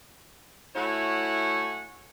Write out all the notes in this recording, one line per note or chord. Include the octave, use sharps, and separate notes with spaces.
A3 E4 F#4 C#5 F#5 G#5